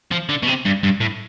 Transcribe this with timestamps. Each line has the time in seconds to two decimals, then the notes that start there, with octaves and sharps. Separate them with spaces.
0.12 F3
0.29 D3
0.43 B2
0.48 C3
0.66 G2
0.83 G2
1.00 A2